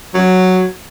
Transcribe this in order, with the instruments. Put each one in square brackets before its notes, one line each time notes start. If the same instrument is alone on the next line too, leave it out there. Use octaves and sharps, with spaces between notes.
[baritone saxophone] F#3